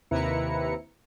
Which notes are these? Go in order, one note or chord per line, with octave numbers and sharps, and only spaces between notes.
D#2 C3 E4 B4 A#5 C#7